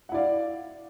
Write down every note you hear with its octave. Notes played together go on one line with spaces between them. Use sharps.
E4 D5 F5 F#5